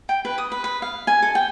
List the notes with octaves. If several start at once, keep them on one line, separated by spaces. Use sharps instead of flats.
G5
B4
D#6
B4
B4
F5
G#5
A4
G5